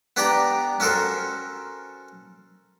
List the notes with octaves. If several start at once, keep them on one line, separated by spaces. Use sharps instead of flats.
B3 D4 G4 D5 G5 A#5
C#4 F#4 A4 A#4 C5